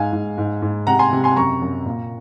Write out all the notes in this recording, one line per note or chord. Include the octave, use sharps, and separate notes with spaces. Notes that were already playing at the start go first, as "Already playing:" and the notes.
Already playing: G#2 F5 G#5
G#2
G#2
G#2
C3 F#5 A#5
G#5 C6
C3
G#5 C6
F#2 A#5 C#6
F#2
A#2